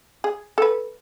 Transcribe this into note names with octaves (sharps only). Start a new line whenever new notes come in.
G#4
A4 B4